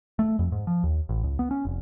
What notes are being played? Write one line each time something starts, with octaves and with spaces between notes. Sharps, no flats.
A3
F2
G#2
F3
D#2
A1
C#2
B3
C#4
F1